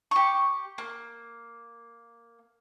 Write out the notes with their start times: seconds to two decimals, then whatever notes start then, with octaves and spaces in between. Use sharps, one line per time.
0.11 G4 C#6
0.78 A#3